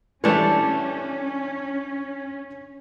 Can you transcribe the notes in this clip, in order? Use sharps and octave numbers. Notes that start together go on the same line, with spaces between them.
E3 G3 A3 C#4 D4 C#5